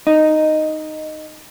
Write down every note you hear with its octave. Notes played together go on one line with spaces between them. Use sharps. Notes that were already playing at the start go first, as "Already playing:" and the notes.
D#4